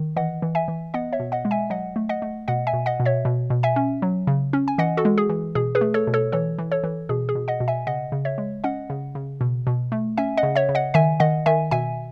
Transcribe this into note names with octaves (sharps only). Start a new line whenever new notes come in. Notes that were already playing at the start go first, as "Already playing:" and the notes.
Already playing: D#3
E3 D#5 F#5
E3
E5 G#5
E3
B3 D#5 F#5
C#5 E5
B2
D#5 F#5
G#3
E5 G#5
F#3 D#5 F#5
A3
D#5 F#5
A3
B2 D#5 F#5
E5 G#5
B2
D#5 F#5
B2
C#5 E5
B2
B2
E5 G#5
C#4
F#3
C#3
C#4
G#5
E3 D#5 F#5
F#4 A4
G#3
G#4
E3
B2 G#4
G#4 B4
A3
A4 C#5
B2
A4 C#5
E3 A4 C#5
E3
A4 C#5
E3
B2 G#4
G#4
B2
D#5 F#5
B2
E5 G#5
C#3 D#5 F#5
C#3
C#5 E5
G#3
C#4 D#5 F#5
C#3
C#3
B2
B2
A3
C#4 E5 G#5
D#5 F#5
C#3
C#5 E5
C#3
D#5 F#5
D#3 E5 G#5
D#3 D#5 F#5
D#3 E5 G#5
B2 E5 G#5